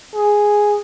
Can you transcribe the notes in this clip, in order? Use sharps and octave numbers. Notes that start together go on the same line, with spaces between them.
G#4